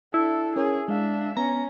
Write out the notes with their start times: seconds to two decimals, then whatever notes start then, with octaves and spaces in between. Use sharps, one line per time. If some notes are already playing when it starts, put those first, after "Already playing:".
0.14 D4 E4 A4
0.56 C#4 G#4 A#4 C#5
0.88 G#3 D4 E5 F5
1.37 B3 C#4 A#5